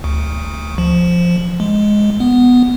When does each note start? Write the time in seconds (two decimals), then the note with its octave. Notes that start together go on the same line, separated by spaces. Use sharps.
0.04 D2
0.78 F3
1.60 G#3
2.20 B3